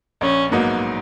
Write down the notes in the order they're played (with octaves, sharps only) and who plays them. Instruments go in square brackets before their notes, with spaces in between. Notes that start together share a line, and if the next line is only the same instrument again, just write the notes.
[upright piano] A#1 [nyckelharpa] C#4
[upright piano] G#2 F#3 B3 D#4 [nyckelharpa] A#3